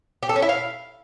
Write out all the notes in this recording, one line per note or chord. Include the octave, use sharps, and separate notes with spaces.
G4
A4
C#4
E4
F5